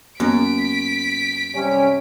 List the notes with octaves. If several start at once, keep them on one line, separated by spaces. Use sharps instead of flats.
F#2 A#3 B3 B6 D7
C3 G3 C#4